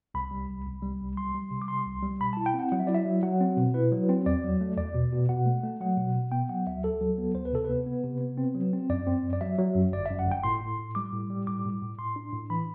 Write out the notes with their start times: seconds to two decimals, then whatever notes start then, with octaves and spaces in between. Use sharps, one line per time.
0.14 C2 B5
0.31 G3
0.49 C2
0.66 C2
0.82 G3
1.00 C2
1.17 G3 C6
1.35 G3
1.51 C3
1.62 D6
1.68 G3 C6
1.85 C2
2.03 G3
2.20 B2 B5
2.33 E4 A5
2.46 G5
2.54 C4 F#5
2.72 F#3 F#5
2.80 E5
2.87 E4 D5
2.95 E5
3.05 F#3
3.23 F#3 F#5
3.40 C4
3.57 B2
3.74 E4 B4
3.92 F#3
4.09 C4
4.26 E2 D5
4.44 F#3
4.61 A3
4.77 E2 D5
4.94 B2
5.12 B2
5.29 B2 F#5
5.46 A3
5.64 A3
5.81 F#3 F#5
5.97 B2
6.15 B2
6.32 B3 G5
6.49 F#3 F#5
6.67 D2 E5
6.84 D2 A4
7.01 F#3
7.18 B3
7.35 D2 C5
7.45 B4
7.53 C3 A4
7.65 B3 B4
7.86 B3
8.04 C3
8.21 B3
8.38 C4
8.55 F#3
8.73 C4
8.90 F#2 D5
9.07 C4
9.24 F#2
9.33 D5
9.41 F#3 E5
9.59 F#3
9.75 F#2
9.92 G1 D5
10.06 F#2 E5
10.19 F#5
10.27 G1 G5
10.44 A2 C6
10.61 A2
10.79 A2
10.95 G3 D6
11.13 A2
11.30 G3
11.47 A2 D6
11.65 A2
11.82 A2
11.98 A2 C6
12.16 D4
12.33 A2
12.50 E3 B5